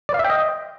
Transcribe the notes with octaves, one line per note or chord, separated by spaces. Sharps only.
D5
F5
E5
G5
D#5